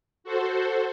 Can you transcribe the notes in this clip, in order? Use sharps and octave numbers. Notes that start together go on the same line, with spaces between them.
F#4 A4 C5